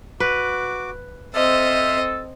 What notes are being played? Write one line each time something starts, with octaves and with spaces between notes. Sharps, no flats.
F#4 B4 D6
C4 A4 C5 D#5 E5 F6